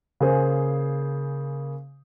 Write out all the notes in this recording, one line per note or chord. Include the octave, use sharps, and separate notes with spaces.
C#3 A#3 G#4 C5